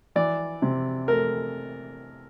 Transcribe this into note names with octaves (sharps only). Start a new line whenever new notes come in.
E3 D5
C3
A3 A#4